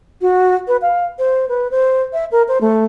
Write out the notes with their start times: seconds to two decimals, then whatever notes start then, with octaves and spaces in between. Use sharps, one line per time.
0.22 F#4
0.68 B4
0.82 F5
1.19 C5
1.49 B4
1.71 C5
2.13 E5
2.32 A#4
2.48 C5
2.61 A3